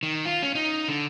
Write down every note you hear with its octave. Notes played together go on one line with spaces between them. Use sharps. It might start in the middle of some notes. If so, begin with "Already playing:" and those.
D#3
F4
C#4
D#4
D3